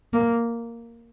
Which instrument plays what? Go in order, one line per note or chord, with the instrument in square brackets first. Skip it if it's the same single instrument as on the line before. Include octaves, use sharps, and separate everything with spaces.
[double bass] A#3